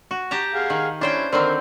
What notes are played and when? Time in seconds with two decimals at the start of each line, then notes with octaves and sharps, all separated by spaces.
0.11 F#4
0.31 G4 A5 A#5
0.55 G#4 F5 F#5
0.70 D#3
1.01 C#4 D4 E4 C5 G5
1.32 D3 D#3 C4 A#4 C5